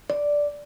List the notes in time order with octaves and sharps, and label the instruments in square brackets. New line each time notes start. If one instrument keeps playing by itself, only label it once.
[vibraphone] D5